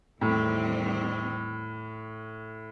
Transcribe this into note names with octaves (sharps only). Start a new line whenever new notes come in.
E2 A2 D#3 G3 C4